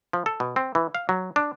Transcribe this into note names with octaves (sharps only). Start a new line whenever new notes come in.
F3
A4
B2
C4
E3
F5
F#3
D4